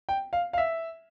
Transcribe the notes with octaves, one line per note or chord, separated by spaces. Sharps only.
G5
F5
F5
E5